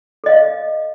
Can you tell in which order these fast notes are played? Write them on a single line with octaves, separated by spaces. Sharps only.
A4 D#5 F5